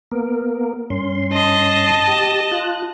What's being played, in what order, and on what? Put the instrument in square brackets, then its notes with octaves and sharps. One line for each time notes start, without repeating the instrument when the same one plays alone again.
[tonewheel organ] A#3 B3 A#4
G2 C#4 C6
[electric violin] D#5 A5
[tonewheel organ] G4
F4 F#6